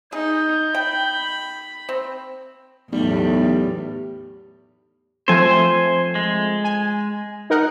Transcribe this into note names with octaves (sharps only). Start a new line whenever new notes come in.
D#4 G#4 G6
G5 B5
C4
B1 E2 A2 G3 A3
F3 A3 C4 C5 G#5
G#3
G#5
D#4 A#4 F#5